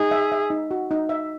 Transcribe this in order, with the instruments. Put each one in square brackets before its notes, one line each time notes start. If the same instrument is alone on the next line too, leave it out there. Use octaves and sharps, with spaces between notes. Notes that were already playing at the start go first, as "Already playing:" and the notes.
Already playing: [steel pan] D#4 [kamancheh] G#4
[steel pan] E5
E5
D#4
F#4
D#4
E5